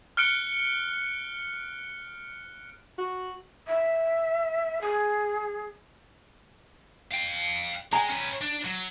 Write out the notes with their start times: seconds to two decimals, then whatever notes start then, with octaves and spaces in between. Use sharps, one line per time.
0.17 F6 F#6 C#7 D7 G7
2.98 F#4
3.67 E5
4.81 G#4
7.11 F5 G5
7.93 G#3 G5 G#5 A#5
8.10 C#4 B4
8.41 D4
8.65 F#3